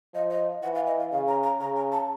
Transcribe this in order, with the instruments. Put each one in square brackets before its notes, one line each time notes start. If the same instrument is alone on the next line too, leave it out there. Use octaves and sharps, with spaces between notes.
[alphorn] F3 [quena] D#5
[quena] D#5
[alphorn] E3 [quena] F#5
[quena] F5
D#5
F5
[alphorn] C#3 [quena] F5
[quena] A#5
A#5
[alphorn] C#3 [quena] A#5
[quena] A#5
A5